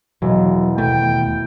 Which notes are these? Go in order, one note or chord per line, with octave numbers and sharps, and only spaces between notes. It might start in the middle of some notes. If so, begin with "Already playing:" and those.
E1 F#3
D#2 B2 A3 G5